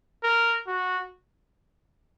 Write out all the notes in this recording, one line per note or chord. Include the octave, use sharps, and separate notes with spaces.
A#4
F#4